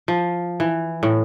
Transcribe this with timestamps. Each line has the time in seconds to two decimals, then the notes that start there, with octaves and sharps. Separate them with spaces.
0.08 F3
0.60 E3
1.03 A2